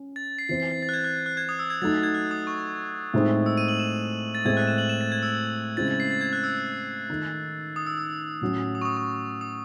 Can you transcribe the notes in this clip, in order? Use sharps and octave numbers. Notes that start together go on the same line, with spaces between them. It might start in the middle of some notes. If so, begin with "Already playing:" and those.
Already playing: C#4
A6
C7
E3 C4 E4 C7
C7
A6
A6
F#6
G#6
F#6
F#6
G#6
D#6
E6
G#6
F#3 A3 D#4 A6
A6
G#6
F#6
D#6
C#6
A2 G#3 C4 D#4
E6
D#7
F#7
E7
A6
A2 G#3 C4 G#6
F#6
E7
F#7
E7
A6
G#6
E6
C#3 G#3 C4 E4 A6
A6
C7
A6
G#6
F#6
E6
D#3 A3 D#4
D#6
E6
E6
A2 F#3 C#4
D#6
C#6
D#6
C#6
D#6